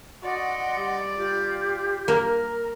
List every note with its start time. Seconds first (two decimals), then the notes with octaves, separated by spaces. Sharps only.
0.23 F#4 D5 D#5 F#5 C6
0.76 G3
1.16 F4 G4
2.08 A#3 A#4